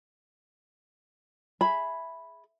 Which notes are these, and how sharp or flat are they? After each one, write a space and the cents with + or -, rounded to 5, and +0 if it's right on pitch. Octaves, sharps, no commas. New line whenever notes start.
G#4 +0 E5 +0 B5 +0